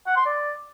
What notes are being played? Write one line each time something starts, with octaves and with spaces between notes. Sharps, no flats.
F#5
C6
D5